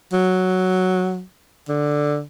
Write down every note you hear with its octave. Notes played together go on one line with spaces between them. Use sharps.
F#3
D3